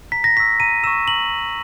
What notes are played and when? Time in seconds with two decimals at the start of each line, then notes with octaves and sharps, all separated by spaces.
0.12 A#5 B6
0.24 A#6
0.37 C#6 E6 B6
0.60 A#5 D#7
0.84 C#6 E6 E7
1.07 A#5 F#7